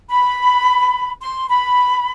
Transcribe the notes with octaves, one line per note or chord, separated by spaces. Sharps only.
B5
C6
B5